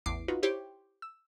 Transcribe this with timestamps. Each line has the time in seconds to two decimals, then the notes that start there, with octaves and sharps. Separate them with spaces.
0.06 A1 E2 D6 C7
0.28 D#4 F4 F#4 B4
0.43 E4 G4 C5 C#5
1.02 E6